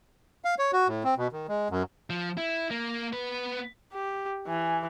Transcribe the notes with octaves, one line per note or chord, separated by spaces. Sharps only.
F5
C#5
F#4
A2
C4
B2
D#3
G#3
F#2
F3
E4
A#3
B3 B4
G4
E3 G#5